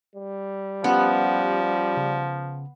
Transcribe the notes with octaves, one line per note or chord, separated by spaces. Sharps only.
G3
F3 B3 C#4 F4 G4
C#3